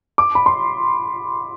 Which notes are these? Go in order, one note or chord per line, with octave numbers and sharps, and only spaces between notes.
D6
B5
C6